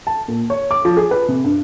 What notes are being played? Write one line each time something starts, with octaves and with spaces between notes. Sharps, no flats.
A5
A#2
C#5
D6
F3
G#4
B4
C3
G2